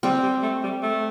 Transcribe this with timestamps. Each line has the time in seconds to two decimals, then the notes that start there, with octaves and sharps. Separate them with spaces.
0.03 G3 C4
0.23 G3
0.43 A3
0.63 G3
0.82 A3